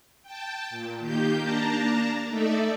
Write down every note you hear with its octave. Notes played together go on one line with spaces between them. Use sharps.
G5 A5
A#2
D#3 A#3 G4 G6
A#3 D4 A5 A#5
A3 D#4 A4 D5 E5